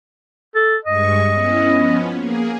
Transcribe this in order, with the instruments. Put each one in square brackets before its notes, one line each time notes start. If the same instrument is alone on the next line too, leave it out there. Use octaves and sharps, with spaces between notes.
[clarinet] A4
[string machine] G2 G#3 C#6 [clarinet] D#5
[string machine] B3 C#4 E4
F3 B3 C#4
A#3 G#4